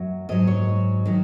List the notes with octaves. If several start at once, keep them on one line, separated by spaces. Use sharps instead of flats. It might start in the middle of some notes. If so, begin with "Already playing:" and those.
Already playing: F#2 F#3
G#2 F#3 D#5
C#5
D#3 F#3